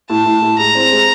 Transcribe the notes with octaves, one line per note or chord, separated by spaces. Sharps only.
A2 A5
A2
A2
G#3 A#5
C4
G#3